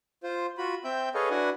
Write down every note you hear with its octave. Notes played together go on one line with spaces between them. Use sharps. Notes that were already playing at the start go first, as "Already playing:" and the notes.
F4 C5
F4 F#4 B5
C4 E5 G5 G6
G#4 A4 B4 C#5 D#5 F5
D4 E4 F#4 B4 F#5 G#5